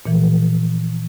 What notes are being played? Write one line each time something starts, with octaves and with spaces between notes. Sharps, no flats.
A#2 E3 F3